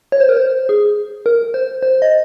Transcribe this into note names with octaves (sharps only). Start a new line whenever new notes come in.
C#5
C5
A#4
C5
G#4
A#4
C5
C5
D#5